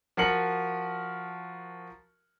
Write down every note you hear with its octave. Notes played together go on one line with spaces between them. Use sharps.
F3 F#4 A#4 C7 C#7 F#7